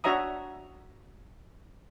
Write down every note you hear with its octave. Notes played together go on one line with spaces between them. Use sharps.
D4 F#4 C#5 E5 A#5 D#6